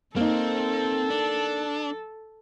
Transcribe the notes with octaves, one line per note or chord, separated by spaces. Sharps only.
A#3 C4 D#4 A4
D4